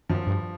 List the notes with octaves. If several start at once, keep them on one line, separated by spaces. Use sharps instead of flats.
F#2 F3
G2